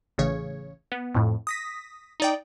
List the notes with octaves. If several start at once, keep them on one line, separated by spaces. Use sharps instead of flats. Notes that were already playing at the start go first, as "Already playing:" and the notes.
A1 C#3 C#5
B3
F2 A2
D#6 A#6 B6
D#4 D5 G5